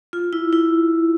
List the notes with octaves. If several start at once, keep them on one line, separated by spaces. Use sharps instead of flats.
F4
E4
E4